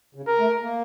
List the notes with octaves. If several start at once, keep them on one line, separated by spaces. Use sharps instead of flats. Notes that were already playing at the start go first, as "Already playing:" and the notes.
C#3
A#4
A3
A#3